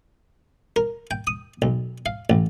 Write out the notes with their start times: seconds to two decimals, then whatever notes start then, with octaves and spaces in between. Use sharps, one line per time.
0.76 A#4
1.11 G5
1.27 D#6
1.62 B1
2.06 F5
2.30 A1